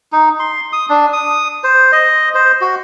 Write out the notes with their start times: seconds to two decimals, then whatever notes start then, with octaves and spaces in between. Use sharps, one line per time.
0.13 D#4
0.39 C6
0.73 D#6
0.89 D4
1.13 D#6
1.64 C5
1.92 D#5
2.35 C5
2.61 F#4